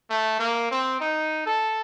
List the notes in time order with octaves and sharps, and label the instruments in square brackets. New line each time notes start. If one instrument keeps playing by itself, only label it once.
[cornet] A3
A#3
C4
D#4
A4